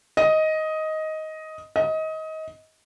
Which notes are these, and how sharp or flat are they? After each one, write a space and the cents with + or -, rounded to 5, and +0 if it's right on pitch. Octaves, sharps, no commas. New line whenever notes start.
D#5 +10
D#5 +25